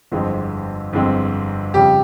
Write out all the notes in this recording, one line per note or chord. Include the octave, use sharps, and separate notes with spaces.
G1 F2 E3 G#3 C4
G1 F2 E3 G#3 C4
F2 C#3 G3 G4